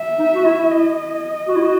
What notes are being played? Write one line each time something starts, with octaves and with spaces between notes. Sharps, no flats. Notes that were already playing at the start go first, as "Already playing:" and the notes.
Already playing: E5
D#4
F#4
E4
D#5
F#4
E4
F#4